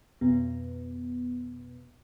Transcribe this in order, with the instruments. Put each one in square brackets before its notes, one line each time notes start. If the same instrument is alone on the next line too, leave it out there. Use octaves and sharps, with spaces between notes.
[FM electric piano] F2 B2 B3